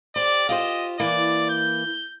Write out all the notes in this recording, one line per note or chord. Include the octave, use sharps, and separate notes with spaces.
G4 C5 D5
F4 G4 C5 D#5
E3 A#3 D5
G6